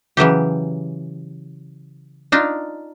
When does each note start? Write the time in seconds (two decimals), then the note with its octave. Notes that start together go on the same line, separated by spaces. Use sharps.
0.17 C#3 E3 F#3 G4
2.32 D4 D#4 F4